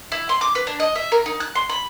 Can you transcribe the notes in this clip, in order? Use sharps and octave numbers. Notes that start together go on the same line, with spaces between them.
E4
C6
D6
B4
D4
D#5
E5
A#4
D#4
F#6
C6
B5